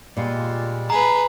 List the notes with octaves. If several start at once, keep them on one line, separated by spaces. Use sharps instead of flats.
A#2 G3 G#3 F4
G#4 B4 A#5